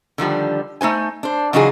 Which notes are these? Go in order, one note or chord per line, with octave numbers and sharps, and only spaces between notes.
D3 D#3 F3 G3
A3 D#4 C5 G#5
D4 C5
C#3 E3 F#3 D#4 F4 G#4